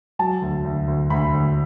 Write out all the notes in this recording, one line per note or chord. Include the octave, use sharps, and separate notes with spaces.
F#3 A5
D2
D2
D2
D2 B5
D2